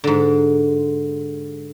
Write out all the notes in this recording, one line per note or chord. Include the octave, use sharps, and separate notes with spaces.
G#2 D3